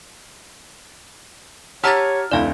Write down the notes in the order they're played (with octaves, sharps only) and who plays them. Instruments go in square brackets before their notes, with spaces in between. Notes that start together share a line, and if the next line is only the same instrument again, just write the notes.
[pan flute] G4 [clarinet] C#5 [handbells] F#5 A#5 A6 [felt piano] A5 E6 F6
[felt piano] F1 D2 [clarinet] E4 [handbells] D5 F5 A5